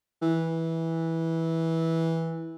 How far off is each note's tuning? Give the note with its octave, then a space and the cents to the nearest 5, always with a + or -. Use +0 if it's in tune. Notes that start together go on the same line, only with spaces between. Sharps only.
E3 -15